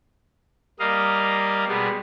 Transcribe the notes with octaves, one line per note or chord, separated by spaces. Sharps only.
G3 A#3 D#5 F5
B2 G3 G#3 B3